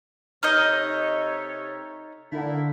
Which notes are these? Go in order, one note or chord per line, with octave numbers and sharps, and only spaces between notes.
C3 D#4 A4 C#5 D#5 F6 G6
D3 A3 A#3 E4